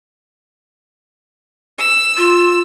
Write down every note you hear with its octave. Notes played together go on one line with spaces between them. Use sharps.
E6
F4